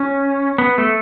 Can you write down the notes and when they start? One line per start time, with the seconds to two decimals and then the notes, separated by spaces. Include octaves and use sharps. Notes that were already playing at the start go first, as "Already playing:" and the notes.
Already playing: C#4
0.58 B3
0.78 A3